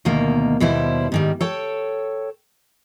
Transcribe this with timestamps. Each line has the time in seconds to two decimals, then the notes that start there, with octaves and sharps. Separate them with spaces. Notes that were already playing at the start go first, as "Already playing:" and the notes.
0.05 D2 B2 D#3 A#3
0.60 D#2 B2 G3 E4 C5
1.12 G#2 D#3 G3
1.41 A4 C#5 G5